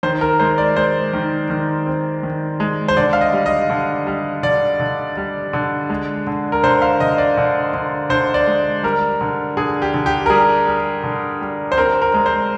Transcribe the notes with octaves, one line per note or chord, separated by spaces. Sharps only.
D#3 C5
A#4
G#3 C5
D5
G#3 C5
D#3
D#3
C4
D#3
G#3
C5
D3 D5
F5
D#5
G3
D#5
D3
G3
D3 D5
D3
G3
D3
G#3
D3
A#4
D3 C5
F5
D3 D#5
D5
D3
D3
D3 C5
D5
G#3
G3 A#4
D3
D3 G#4
G4
D3
G4
A#4
G3 G#4
G3
D3
G3
C5
C4 A#4
A#4
G#3
C5